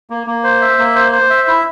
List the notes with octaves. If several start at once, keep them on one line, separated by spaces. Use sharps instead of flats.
A#3
A#3
C5
E5
A#3
C5
C5
E5
E4